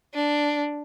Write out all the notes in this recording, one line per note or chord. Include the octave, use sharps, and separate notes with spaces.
D4